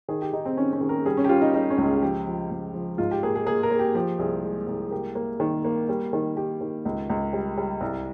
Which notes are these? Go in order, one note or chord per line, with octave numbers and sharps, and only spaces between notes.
D#3 G#4
G4
D#3 D#4
C4
D#3 C#4
C#4
D#3
A#4
G3 G#4
C#4
G4
G3 F4
D#4
G3 D#4
C#4
C#2
G#4
F3 G4
F3
C#2
F3
G#2 F4
G4
A#3 G#4
G#4
A#3 G#4
A#4
A#3
G4
F3 G4
C2 G#4
G#3
C2
A#3 G4
A#3
D#3
A#3
G3
D#3
D#3 G4
D#3
C#2
C#2
G3
G3
C2